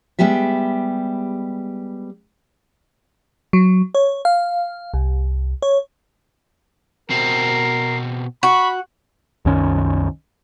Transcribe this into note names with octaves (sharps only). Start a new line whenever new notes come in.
G3 G#3 B3 G4 E5
F#3
C#5
F5
C2
C#5
B2 C4 A#4 C7
F#4 B5 C#6
C2 F#2 D#3 C#4